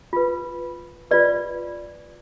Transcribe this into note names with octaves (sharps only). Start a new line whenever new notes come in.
F4 B4
F4 B4 D5